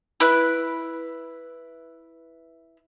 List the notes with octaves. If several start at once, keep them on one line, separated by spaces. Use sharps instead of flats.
E4 B4 F#6